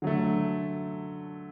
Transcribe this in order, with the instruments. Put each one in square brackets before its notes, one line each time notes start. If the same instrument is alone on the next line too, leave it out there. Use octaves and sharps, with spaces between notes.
[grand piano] D3 F#3 A3